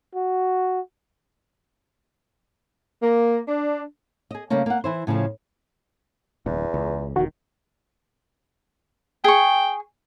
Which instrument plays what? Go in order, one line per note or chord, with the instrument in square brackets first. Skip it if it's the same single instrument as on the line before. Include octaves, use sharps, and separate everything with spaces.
[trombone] F#4
[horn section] A#3
D4
[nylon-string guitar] G#4 D#5
C#3 G3 A3 A#3 C#4
A#3 F#5
E3 E4 C5
A2 C#3 E3 F3 A3
[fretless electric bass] D1 [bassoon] E2
[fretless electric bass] C#2
[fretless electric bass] E1 D#3 [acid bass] F#4
[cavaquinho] G#4 C#6 [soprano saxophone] G5